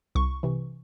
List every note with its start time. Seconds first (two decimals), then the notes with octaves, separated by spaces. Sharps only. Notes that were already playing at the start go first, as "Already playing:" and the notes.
0.15 C2 C#6
0.43 C3 E3